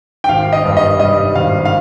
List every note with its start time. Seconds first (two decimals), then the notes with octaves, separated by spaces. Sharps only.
0.24 G5
0.28 G#1 F5
0.53 D#5
0.65 G2
0.77 D#5
1.00 G3 D#5
1.35 G#1 F5
1.65 F5